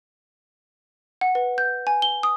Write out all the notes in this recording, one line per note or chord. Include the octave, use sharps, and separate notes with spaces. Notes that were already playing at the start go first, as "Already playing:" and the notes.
F#5
B4
G6
G#5
G7
D#6